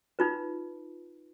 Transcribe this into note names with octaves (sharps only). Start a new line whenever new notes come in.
D#4 F4 B4